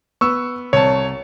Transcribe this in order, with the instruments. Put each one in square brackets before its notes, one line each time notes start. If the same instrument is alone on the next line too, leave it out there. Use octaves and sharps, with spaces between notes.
[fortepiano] B3 [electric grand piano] C#6 E6
[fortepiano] C2 A5 [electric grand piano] C#5